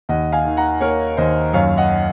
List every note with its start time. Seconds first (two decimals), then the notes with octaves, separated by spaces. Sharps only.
0.09 D#2 D#5 F#5
0.32 F5 G#5
0.45 D#3
0.57 F#5 A#5
0.81 A#3 A#4 C#5
1.17 D#2 C5 D#5
1.53 F#2 C#5 F5
1.77 D#5 F#5